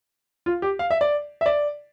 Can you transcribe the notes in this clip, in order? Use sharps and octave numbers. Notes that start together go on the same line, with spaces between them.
F4
G4
F5
E5
D5
E5
D5